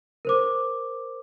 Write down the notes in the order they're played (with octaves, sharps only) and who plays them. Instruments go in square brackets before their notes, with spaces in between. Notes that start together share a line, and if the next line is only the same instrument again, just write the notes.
[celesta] A#4 C5 D6